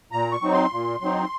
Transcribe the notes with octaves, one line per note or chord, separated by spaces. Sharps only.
A#2 A#5
C#6
F#3 C4 D#4
C6
A#2
F#3 C4 D#4